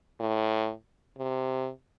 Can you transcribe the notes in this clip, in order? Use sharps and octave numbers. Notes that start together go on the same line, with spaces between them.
A2
C3